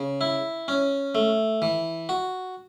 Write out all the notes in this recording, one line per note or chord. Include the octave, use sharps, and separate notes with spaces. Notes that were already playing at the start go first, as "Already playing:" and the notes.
Already playing: C#3
E4
C#4
A3
E3
F#4